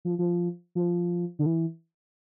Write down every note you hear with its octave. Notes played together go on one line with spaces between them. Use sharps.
F3
F3
F3
D3
E3